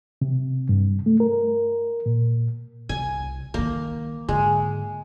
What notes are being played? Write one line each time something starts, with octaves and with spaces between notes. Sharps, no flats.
C3
G2
A3
A#4
A#2
C2 G#5
D#3 G3 A#3
G#2 D3 G#3